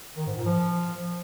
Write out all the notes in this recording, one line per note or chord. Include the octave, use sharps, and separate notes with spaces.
D#3
G#2
A#2
F3